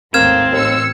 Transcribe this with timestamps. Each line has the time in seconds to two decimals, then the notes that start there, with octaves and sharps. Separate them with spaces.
0.14 G#1 D#2 A2 A#3 C4 F6 G#6 E7
0.51 A1 D#2 E6 C#7